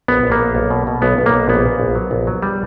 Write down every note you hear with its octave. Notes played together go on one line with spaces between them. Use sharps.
A#1 B3
A#1
A#3
A#1
B1
B2
B2
B1 B3
B1
A#3
B1
A#1 B3
A#2
A#1
F#3
A#1
F#3
G3